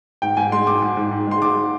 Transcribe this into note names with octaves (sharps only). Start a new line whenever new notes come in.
G#2 G5
G#2 G#5
G#3 C6
G#2 D6
G#2
G#2
G#2
G#3 C6
G#2 D6